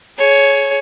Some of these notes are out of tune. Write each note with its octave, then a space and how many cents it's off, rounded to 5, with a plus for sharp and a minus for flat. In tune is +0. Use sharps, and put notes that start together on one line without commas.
G#4 +30 C#5 +0